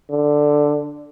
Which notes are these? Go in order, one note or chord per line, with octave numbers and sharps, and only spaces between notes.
D3